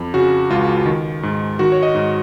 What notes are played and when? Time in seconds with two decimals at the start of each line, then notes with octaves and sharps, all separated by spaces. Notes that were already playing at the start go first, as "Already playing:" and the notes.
Already playing: F2
0.14 C#3 F#4
0.50 C#2 F4
0.86 D#3
1.23 G#2
1.59 D#3 F#4
1.72 C#5
1.83 D#5
1.95 G#2